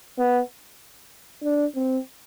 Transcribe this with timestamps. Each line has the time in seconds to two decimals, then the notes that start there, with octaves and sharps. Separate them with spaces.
0.18 B3
1.43 D4
1.76 C4